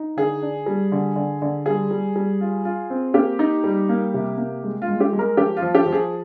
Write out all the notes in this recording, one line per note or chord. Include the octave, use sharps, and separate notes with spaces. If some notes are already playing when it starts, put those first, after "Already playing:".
Already playing: D#4
D3 G#4
D4
G3
D3
D3
D3
G3 G#4
G3
G3
F4
F4
C4
A#3 G4
D#4
G3
A#3
C3
A#3
G#3
F4
G#3
G4
G#3
A#4
F3 G4
F4
F3
G4
F3
G#4